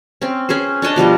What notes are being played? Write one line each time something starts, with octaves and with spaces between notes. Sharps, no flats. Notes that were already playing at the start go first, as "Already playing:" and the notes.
C4 C#4
C#4 G#4 B4 C5
D4 C#5 D#5 A5
B2 F3 G3 D#5